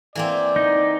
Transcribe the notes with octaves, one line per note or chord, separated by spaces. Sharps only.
E3 A#3 C4 D5
D#4